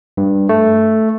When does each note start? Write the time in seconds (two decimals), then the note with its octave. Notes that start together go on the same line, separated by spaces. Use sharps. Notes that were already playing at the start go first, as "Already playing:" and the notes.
0.17 G2
0.49 A3